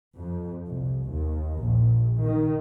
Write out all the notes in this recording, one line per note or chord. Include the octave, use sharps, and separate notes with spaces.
F2
C2
D#2
A#1
D#3